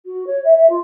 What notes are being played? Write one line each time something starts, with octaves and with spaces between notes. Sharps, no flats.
F#4
C#5
E5
E5
F4